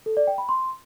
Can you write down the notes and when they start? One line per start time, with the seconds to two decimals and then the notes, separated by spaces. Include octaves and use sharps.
0.06 A4
0.17 D5
0.27 G5
0.38 B5
0.49 C6